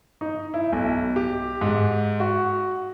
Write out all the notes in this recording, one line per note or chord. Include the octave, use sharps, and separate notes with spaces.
D#4
E4
B1
G4
G#2
F#4